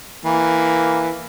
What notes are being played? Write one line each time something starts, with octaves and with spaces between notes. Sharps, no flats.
E3 A#3